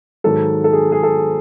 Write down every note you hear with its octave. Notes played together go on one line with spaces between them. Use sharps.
G#2 D#3 F#3 A4
A4
G#4
G#4
A4